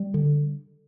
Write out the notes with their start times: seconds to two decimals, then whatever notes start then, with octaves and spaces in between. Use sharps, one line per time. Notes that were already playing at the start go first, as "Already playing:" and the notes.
Already playing: G3
0.14 D3